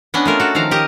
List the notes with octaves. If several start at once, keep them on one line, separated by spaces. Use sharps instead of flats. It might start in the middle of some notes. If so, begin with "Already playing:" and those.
B3 C#4 D4 D#5 G#5
A3 F4 A#4
F#4 A4
D#3 F3 F5 A#5
G4 A#4 D#5